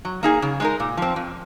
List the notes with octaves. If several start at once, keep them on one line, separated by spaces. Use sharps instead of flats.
F#3
A#3 D#4 G#4
C#3
G#3 D#4 A#4
A#2
F3 C4
F2